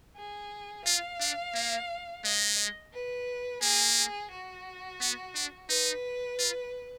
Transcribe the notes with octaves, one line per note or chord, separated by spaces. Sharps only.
G#4
F4 F5
D4
A#3
G#3 D#5
B4
A#3 G#4
G#4
F#4
B3
D4
D#4 B4
F4